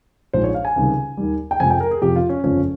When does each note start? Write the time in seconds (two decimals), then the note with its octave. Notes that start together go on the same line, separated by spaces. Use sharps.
0.33 A#1 G#2 F3 G#3 C5
0.44 C#5
0.54 F5
0.65 G#5
0.76 C#2 C3 D#3 G3
1.17 D#2 D#3 G3
1.51 G5
1.60 F2 C3 F3 G#3 G#5
1.70 G5
1.80 A#4
1.91 G#4
2.02 F2 C3 F3 G4
2.16 F4
2.29 C#4
2.43 G1 F2 C#3 F3 G#3 C#4